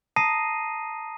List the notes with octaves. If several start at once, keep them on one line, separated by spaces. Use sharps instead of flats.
A5 A#5 D#6 A#6 C7 D#7